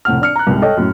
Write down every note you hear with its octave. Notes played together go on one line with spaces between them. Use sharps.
F1 A2 F#5 F6
D4 F6 C#7
A#5 F#6
C2 G#2 C3
A4 C#5 D#5 G5
F#2 A2